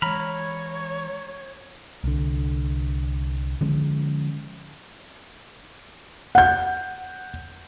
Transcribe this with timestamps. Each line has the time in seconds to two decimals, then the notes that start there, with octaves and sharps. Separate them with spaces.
0.02 E3 G#3 C#5 A#5 B5 F6
2.04 C2 D3
3.61 D3 F3 G#3 C#4
6.35 F#5 G6